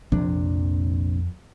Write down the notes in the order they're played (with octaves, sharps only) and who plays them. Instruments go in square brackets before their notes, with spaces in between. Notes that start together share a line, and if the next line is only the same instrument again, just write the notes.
[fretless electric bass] A#1 C3 D4 [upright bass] F2